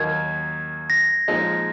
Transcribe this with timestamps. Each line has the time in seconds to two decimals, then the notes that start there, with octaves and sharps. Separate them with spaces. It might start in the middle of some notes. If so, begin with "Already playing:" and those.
Already playing: D#2 D#3 F#3 A#3 D#4 G#6
0.90 A#6
1.28 A#2 F3 G#3 D#4